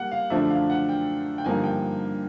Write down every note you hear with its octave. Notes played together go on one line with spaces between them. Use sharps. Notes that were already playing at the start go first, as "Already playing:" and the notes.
Already playing: G3 A#3 F#5
F5
F#2 D3 F3 A3 D4 E5
F5
F#5
G5
G5
G2 D3 F3 A#3 D#4 G#5
G5